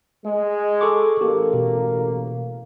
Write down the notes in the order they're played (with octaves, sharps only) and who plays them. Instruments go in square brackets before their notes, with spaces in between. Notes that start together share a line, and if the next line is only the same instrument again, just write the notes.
[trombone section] G#3
[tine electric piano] A4 C#6 D6
[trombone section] A1 A#3 [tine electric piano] G4 A4
[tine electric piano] B2